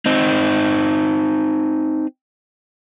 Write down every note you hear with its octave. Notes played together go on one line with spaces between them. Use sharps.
C4 D#4